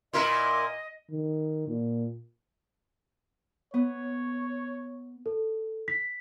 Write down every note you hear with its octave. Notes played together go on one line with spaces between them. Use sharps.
A#2 E4 A#4 D#5 C6
D#3
A#2
B3 C#5
A4
B6